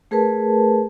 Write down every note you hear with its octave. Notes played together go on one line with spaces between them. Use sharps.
A3 G#4 A#4 B4 A5